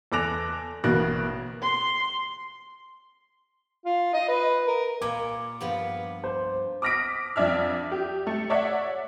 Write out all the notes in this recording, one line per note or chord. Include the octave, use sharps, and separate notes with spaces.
E2 A4 D6 F#6 A#6 F7
A1 B2 A#3 F#4 F#6 A#6
C6
F4
D#5
B4
A#4
A#2 G#5 D6
G2 F3 B3
C5
D6 D#6 F6 A#6 B6 D7
F2 D4 D5 E5 F6
G4
A3
C#5 D5 E5 F#5